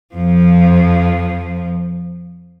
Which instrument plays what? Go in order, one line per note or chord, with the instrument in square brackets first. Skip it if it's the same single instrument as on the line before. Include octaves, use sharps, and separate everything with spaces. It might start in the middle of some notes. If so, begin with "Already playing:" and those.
[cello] F2 F3